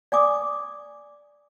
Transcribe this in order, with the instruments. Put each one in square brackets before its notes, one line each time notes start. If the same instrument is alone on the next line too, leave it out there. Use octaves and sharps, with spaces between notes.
[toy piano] D5 G#5 D6 D#6